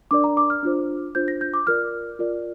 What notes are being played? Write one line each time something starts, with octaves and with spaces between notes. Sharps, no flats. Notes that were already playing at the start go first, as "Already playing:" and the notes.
D4 A#4 D5 D6
A#5
D6
F6
D4 F4 C5
D4 F4 C5 G6
A#6
G6
D6
F4 A#4 D5 F6
F4 A#4 D5